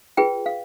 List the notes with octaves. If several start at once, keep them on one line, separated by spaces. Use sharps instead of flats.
F4 G#4 B4 G5
F5